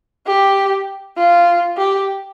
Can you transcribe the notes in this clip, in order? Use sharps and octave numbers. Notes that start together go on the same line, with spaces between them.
G4
F4
G4